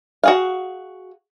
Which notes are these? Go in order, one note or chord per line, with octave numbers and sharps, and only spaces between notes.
F#4 G#4 F5